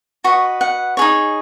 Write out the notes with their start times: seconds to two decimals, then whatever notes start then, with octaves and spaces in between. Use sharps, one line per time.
0.24 F#4 B4 D#5 C#6
0.61 F#5
0.97 D#4 G#4 C#5